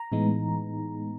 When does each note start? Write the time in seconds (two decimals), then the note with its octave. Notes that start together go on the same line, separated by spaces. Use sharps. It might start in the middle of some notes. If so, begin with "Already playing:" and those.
Already playing: A#5
0.12 A2 E3 G#3 B3 D#4